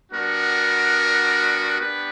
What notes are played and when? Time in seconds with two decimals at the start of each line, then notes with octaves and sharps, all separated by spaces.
0.12 G3 B3 D4 F#4 A#4
1.79 B3 D4 G4 B4